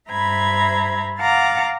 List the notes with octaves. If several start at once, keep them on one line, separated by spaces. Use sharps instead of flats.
G2 C5 E5 A#5 B5 G#6
F5 F#5 A#5 D6 A6